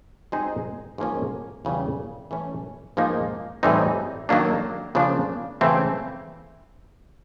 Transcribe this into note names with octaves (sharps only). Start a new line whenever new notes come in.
G#3 C4 D#4 G#4
G#2 F3 A#3 C#4
E2 C#3 E3 G3
E3 A3 C#4
G#2 F3 A#3 D#4
A2 E3 G3 C4 D#4
D#3 F#3 A#3 D4
C#3 F3 A#3 D4
C#3 E3 A3 C4 E4